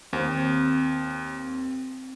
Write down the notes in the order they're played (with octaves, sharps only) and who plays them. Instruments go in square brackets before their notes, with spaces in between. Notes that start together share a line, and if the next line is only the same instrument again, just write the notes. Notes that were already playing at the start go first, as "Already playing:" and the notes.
[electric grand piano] D#2 [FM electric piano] C4